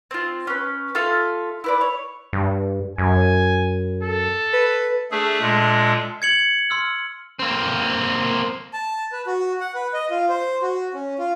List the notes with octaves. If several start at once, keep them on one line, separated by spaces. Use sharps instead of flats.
C4 F4
C#4 B4
F4 A4 E5 F5
E4 B4 D5
C#5
G2
F#2 G#5
A4
B4
A3 D4 G#4 A4 E5
A#2 G#3
G#6 C#7 F#7
C6 E6 F6
A#3 C4
A5
B4
F#4
F#5
B4
D#5
F4
C5
F#4
C#4
F4